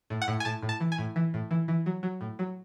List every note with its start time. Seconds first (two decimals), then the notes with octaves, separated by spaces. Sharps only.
0.10 A2
0.22 F#5
0.28 A2
0.40 G#5
0.45 A2 A5
0.63 A2
0.69 A5
0.80 E3
0.92 G#5
0.98 A2
1.16 E3
1.34 A2
1.51 E3
1.68 E3
1.86 F#3
2.03 F#3
2.21 A2
2.39 F#3